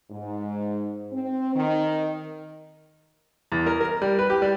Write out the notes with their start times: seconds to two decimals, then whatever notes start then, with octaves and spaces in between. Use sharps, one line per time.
0.11 G#2
1.13 C4
1.56 D#3
3.52 E2
3.66 A#4
3.81 A#4
4.02 G3
4.19 B4
4.30 G4
4.42 G3